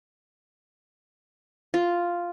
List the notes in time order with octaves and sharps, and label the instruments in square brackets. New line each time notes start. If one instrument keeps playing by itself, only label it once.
[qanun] F4